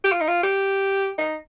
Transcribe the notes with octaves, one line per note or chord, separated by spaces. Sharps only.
G4
F4
D#4
F4
G4
D#4